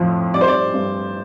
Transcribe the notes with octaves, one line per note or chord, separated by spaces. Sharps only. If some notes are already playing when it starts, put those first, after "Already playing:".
Already playing: F2 A2 F3
G3 D5
C5
D5
G2